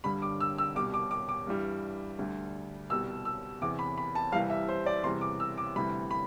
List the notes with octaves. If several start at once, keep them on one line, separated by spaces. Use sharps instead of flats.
G2 D3 G3 B5
D6
E6
E6
C2 B2 G3 D6
D6
D6
D6
G2 E3 G3
D2 D3 G3
C2 B2 G3 E6
E6
E2 C3 E3 D6
B5
B5
A5
C2 C3 E3 G3 F5
E5
C5
D5
E2 C3 E3 G3 C6
D6
E6
D6
D2 C3 E3 G3 B5
B5